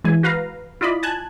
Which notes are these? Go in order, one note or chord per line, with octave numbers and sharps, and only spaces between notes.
E3 G#3 G#5
F#4 B4 F5 A#5
E4 F4 D5 D#5 B5
G#5 A5 F#6 G#6